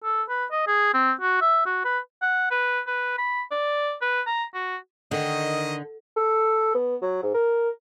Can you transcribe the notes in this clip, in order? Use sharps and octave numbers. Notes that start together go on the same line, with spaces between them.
A4
B4
D#5
G#4
C4
F#4
E5
F#4
B4
F#5
B4
B4
B5
D5
B4
A#5
F#4
D3 D#3 D#5
A4
B3
F#3
G#2
A#4